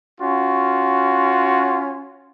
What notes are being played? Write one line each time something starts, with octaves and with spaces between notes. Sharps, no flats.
C#4 F4 F#4